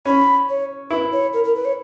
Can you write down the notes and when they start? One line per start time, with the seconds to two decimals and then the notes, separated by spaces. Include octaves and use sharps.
0.05 C#4 B5
0.49 C#5
0.90 E4 B4
1.12 C#5
1.33 A#4
1.44 A#4
1.55 B4
1.65 C#5